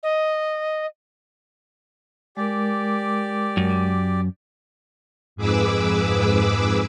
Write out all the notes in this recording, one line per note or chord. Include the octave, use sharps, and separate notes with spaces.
D#5
G#3 G4 A#4 D5
F#2
F2 G#2 G#4 B4 D6 E6